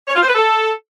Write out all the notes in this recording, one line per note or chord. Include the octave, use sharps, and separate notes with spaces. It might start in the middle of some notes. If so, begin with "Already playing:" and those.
C#5
F4
C5
B4
A4